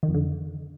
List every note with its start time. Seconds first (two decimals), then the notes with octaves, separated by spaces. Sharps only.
0.03 D#3
0.09 F2
0.14 D3